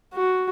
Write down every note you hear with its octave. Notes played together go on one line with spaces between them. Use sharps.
F#4